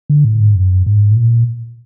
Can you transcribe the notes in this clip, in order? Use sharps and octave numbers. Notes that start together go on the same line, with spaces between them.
D3
A2
G#2
F#2
G#2
A2
A#2